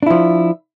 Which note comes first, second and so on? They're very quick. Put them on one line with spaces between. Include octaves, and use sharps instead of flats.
D4 E4 F3